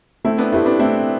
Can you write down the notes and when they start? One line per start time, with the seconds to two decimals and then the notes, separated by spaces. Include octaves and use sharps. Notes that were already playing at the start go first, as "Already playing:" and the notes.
0.25 A3 C4 E4
0.38 B3 D4
0.52 A3 C4 E4 G4 B4
0.66 B3 D4
0.79 A3 C4 E4